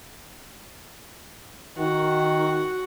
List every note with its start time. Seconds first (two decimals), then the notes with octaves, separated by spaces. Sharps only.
1.78 D#3 F#4